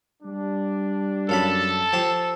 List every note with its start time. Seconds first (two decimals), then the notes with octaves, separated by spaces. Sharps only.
0.23 G3 D4
1.29 F#2 A4 F5 A5 B5
1.93 F3 G4 C6